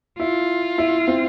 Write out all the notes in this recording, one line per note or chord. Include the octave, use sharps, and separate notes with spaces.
E4 F4
E4
C4